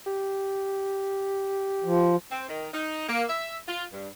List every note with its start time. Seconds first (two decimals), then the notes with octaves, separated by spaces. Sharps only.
0.06 G4
1.84 F3
2.31 C4
2.49 D#3
2.73 D#4
3.08 A#3
3.29 E5
3.68 F4
3.92 G2